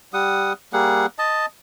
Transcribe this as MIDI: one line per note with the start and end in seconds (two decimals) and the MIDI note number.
0.13 0.53 55
0.13 0.53 78
0.13 0.53 87
0.73 1.06 55
0.73 1.06 58
0.73 1.06 68
0.73 1.06 78
1.19 1.46 75
1.19 1.46 81